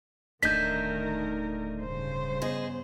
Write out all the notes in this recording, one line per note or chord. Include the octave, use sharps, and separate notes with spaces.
D1 D#3 A3 D4 D#4 A#4 G6 B6
G2 C#3 C5
B3 G#4 D#5